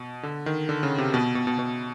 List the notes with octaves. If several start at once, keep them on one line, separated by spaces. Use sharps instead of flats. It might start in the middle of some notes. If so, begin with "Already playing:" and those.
Already playing: B2
D3
D#3
D3
C#3
C3
B2
B2
B2
B2